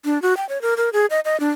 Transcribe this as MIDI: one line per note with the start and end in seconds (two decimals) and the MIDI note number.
0.05 0.21 62
0.22 0.36 66
0.37 0.47 79
0.49 0.61 73
0.62 0.74 70
0.77 0.89 70
0.93 1.06 68
1.10 1.20 75
1.25 1.39 75
1.40 1.50 62